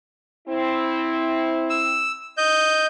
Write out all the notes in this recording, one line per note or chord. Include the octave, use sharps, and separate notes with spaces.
C4 E4
E6
D#5 G6